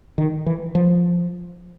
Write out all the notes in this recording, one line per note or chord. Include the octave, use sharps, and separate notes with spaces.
D#3
E3
F3